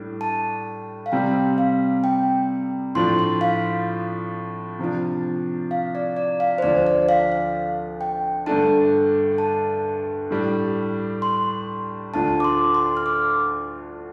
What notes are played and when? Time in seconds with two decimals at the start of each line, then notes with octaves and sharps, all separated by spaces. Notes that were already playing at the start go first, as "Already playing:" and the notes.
Already playing: A2 G3 D4
0.21 A5
1.06 F5
1.12 C3 G3 C4 G5
1.58 F5
2.04 G5
2.95 A2 F3 D4 F4 C6
3.19 C6
3.41 F5
4.79 C3 F3 D4
5.71 F5
5.95 D5
6.16 D5
6.40 F5
6.58 C5
6.62 D2 D3 F3 D4 D5
6.87 D5
7.09 F5
7.32 F5
8.01 G5
8.46 G2 D3 A3 D4 A5
9.38 A5
10.30 A2 G3 D4
11.22 C6
12.14 D2 D3 A3 D4 F4 A5
12.40 D6
12.44 C6
12.75 C6
12.97 F6
13.06 D6